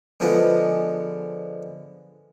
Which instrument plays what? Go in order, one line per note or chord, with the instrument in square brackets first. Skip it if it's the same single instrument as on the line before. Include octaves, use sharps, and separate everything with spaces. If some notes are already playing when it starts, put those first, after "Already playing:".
[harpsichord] D3 F3 G#3 B3